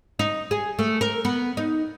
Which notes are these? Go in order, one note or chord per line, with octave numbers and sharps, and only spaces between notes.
D#4
G#4
A3
A#4
B3
D#4